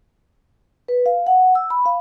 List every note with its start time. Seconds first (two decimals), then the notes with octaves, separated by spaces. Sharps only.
0.88 B4
1.06 F5
1.27 F#5
1.55 E6
1.70 B5
1.86 F5